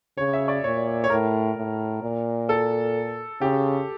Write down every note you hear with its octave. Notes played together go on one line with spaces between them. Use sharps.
C#3 C#5
E5
D5
A#2 C#5
C#5
A2 A#4
A2
A#2
A4
C#3 G4